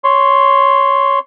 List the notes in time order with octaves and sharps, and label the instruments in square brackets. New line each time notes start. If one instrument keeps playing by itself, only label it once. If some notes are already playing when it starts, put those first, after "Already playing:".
[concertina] C#5 C6